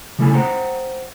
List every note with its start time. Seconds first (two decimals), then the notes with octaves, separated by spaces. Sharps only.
0.19 C#3 G3 A3 E4 A4 G#5
0.33 C5 F#5 G5 A#5 C6